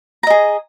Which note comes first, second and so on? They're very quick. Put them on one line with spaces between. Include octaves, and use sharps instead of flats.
A#5 D#5 G#4